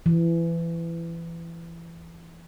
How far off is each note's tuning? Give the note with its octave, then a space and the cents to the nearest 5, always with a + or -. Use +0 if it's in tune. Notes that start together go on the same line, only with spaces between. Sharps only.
E3 +25